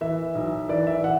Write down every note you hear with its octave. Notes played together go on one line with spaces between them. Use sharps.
E3 E5
B1
E3 D5
E5
E3 F#5